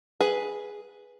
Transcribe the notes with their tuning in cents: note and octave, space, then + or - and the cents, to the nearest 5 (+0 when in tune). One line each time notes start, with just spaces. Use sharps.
G#4 +0 B4 +0